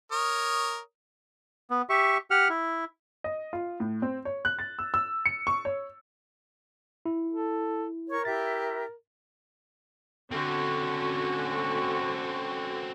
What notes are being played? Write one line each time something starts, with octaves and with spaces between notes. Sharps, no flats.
A#4 C#5 D#6
B3
G4 E5 C#6
G4 F#5 F6
E4
D#5
F4
A2
C4
C#5
F#6
A6
E6
E6
C#7
C#6
C#5
E4
A4
A#4 C#5 C#6
E4 G4 E5 A6
D3 C4 C#4 F#4